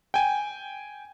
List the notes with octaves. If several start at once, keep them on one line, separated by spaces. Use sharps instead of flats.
G5 G#5